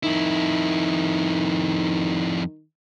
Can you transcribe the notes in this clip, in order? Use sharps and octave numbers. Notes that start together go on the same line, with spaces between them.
F2 D#3 E4